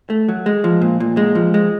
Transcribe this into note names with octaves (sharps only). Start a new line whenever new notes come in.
A3
F#3
G#3
F3
A#2
A#2
G#3
F3
G#3